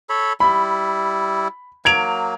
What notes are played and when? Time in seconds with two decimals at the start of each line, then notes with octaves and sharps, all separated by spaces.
0.09 A4 C#5 B5
0.40 G3 E4 B5
1.85 F#3 A#3 G#6 D7 F7